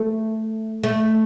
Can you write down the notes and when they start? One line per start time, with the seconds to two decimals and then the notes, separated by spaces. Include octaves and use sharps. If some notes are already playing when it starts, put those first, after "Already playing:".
Already playing: A3
0.84 A3